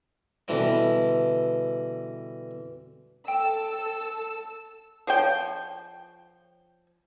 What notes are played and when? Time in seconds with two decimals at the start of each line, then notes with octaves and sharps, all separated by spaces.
0.48 B2 D3 E3 G3
3.28 A4 G5 E6
5.07 F3 C#5 G5